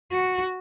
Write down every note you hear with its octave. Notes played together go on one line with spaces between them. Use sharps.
F#4